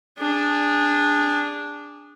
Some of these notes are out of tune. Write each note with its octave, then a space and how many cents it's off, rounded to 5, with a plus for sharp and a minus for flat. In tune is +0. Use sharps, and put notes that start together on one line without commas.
D4 -5 G#4 -25